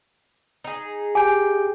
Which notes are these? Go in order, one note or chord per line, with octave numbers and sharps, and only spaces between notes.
D#4 G#4
G4 G5 G#5